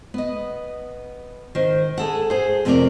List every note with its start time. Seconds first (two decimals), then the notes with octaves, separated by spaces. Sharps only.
0.14 B3 D#5
1.55 D#3 C5
1.97 G#4 A4 F#5
2.30 G#4 C5
2.65 F2 C3 A3 C4 A#4 D5